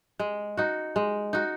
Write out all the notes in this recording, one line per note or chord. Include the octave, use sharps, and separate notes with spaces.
G#3
D#4 F#4
G#3
D#4 F#4